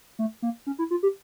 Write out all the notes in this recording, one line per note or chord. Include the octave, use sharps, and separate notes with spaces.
A3
A#3
C#4
E4
F4
G4